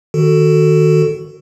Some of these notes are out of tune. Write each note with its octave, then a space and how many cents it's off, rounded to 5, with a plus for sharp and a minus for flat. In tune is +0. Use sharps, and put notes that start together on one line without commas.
D#3 -5 F#4 +0 A4 +10